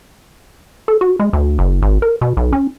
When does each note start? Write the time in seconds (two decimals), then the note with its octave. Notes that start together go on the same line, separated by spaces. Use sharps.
0.88 A4
1.01 F#4
1.20 G#3
1.33 D2
1.58 F#1
1.82 G#1
2.02 A#4
2.21 B2
2.37 B1
2.53 C#4